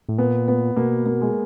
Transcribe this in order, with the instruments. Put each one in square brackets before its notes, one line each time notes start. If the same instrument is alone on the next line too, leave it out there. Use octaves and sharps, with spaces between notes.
[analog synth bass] A2
[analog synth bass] A#2 [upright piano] B3
[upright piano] B3
[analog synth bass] B2 [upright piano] A#3
[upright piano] A#3
G#3